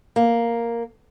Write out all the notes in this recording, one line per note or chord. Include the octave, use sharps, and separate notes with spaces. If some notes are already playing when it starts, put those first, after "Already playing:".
A#3